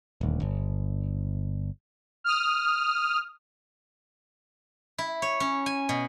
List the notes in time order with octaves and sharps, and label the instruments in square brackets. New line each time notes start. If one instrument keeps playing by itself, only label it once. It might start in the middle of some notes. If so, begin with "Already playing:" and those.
[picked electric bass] D#1 D2
G1
[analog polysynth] D#6 F6
[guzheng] E4
C#5
C#4
G#5
B2